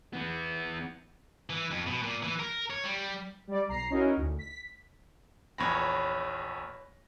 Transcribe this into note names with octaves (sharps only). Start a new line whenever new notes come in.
E3 B3
E3
F2
B2
A#2
E3
A#4
C#5
G3
G3 D5
B1 A#5 C7
C#4 D#4 E4 F#4 A#4
D2
B6
A#1 E2 B4 C#5 B5 A#6